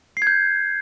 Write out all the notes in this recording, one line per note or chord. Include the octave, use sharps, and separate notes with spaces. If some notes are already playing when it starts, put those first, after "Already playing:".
C7
G#6
G6